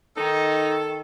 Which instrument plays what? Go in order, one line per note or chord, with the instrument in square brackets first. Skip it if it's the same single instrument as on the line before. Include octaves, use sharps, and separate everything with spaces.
[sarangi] D#3 [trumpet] D#4 [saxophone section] A4